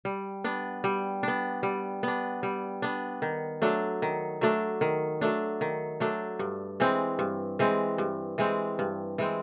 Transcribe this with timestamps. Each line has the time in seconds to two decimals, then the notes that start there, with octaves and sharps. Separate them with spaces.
0.05 G3
0.44 B3 D4
0.84 G3
1.23 B3 D4
1.63 G3
2.03 B3 D4
2.43 G3
2.82 B3 D4
3.22 D#3
3.62 F#3 A3 D4
4.02 D#3
4.41 F#3 A3 D4
4.81 D#3
5.21 F#3 A3 D4
5.61 D#3
6.00 F#3 A3 D4
6.39 G2
6.80 E3 G#3 C4
7.19 G2
7.59 E3 G#3 C4
7.98 G2
8.38 E3 G#3 C4
8.79 G2
9.18 E3 G#3 C4